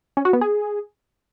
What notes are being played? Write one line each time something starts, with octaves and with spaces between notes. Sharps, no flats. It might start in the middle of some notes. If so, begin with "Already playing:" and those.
C#4
F#4
B3
G#4